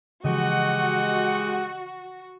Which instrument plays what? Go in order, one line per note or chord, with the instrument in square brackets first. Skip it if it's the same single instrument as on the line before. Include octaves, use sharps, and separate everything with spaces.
[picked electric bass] C#3 E3 F3 [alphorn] G#3 [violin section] F#4 [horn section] G4 D#5 F#5